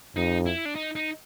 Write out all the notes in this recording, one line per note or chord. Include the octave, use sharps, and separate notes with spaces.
F2 D#4
E4
D4
D#4
D#4